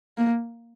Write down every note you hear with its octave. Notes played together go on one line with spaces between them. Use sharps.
A#3